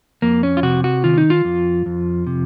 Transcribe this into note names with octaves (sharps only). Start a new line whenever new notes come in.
F2 A#3
C#4
F4
C3 F#4
F#4
D#3 F4
D#4
F4
F2
F2
C3